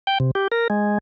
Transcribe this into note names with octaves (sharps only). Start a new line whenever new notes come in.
G5
C3
G4
A#4
G#3